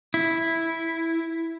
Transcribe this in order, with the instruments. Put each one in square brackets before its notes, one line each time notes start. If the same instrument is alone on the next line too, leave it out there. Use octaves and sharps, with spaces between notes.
[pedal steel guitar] E4